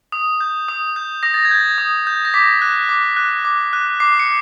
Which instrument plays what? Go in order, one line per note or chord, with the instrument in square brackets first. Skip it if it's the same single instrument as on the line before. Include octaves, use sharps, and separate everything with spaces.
[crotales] D#6
G6
D#6
G6
D#6 A#6
A6
G#6
G6 A6
D#6
G6
A#6
D6 B6
F#6
D6
F#6
D6
F#6
D6 C7
C#7